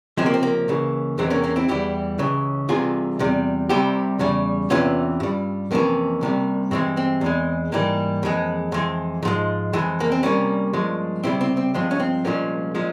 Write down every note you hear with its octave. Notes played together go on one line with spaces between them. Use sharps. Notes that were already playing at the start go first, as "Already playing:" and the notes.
C#2 C3 F3 G#3 C4
A#3
C4
A#3
C#2 C#3 E3
E2 C3 E3 G#3 C4
A#3 C#4
A#3 C#4
C4 E4
E2 E3 G3 E4 G4
C#2 C#3 E3
C2 C3 E3 F4 G#4
E2 C3 G3
C2 C3 G3 E4 G4
E2 C#3 G3
E2 C3 E3 C#4 F4
G2 G3
F2 C3 E3 A#3 C#4
C2 C3 G3
G2 E3 G#3 C4
C4
E2 E3 G#3
G#2 E3 G3 A#3
F2 E3 G#3
F2 E3 G#3
G#2 F3 G#3
F2 E3 G#3
A#3
C4
C2 C3 G3 A#3 C#4
G2 F3 G#3
C#2 C3 G3 C4 E4
C4
C4
G2 F3 G#3 C4
C#4
C4
C2 A#2 F3 G#3 A#3 C#4
A#2 F3 G#3